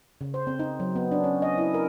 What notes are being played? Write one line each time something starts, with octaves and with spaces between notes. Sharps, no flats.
C#3
C5
C4
D#4
F#3
B3
D4
C#4
D#5
E4
A#4